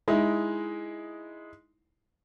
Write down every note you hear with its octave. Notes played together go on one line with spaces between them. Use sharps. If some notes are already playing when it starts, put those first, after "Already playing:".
G#3 D#4 E4